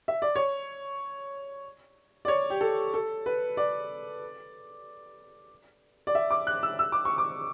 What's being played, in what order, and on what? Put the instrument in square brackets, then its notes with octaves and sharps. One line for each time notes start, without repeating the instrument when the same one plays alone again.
[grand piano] E5
D5
C#5
D5
C#5
G4
A4
A4
B4
D5
D5
E5
D6
F#6
E6
E6
D6
C#6
D6